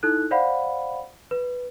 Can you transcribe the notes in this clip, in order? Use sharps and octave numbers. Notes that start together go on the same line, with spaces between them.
D#4 E4 A4 F#6
C5 D5 F5 F#5 B5
B4